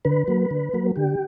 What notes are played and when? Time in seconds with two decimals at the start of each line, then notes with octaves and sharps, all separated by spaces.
0.05 D3 B4
0.28 F#3 A#3
0.51 D3
0.73 F#3 A#3
0.96 D3 G4